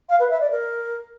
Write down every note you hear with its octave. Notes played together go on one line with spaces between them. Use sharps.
F5
B4
E5
D5
A#4